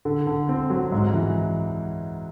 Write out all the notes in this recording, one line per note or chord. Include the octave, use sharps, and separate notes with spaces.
D3
D3
C4
F#3
G#2
E3